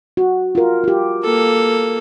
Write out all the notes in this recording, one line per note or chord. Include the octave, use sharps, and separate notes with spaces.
F#4
F4 A#4
F4 G4
A#3 A4